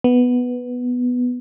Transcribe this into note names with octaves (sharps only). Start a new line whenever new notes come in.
B3